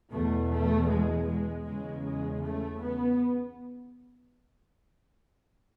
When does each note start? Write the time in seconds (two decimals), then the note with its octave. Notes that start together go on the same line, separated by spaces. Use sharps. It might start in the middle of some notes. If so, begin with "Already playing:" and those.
0.12 E2 B2 A3
0.51 A3
0.89 G#3
1.28 G#3
1.66 E2 C#3 G#3
2.05 G#3
2.43 A3
2.83 B3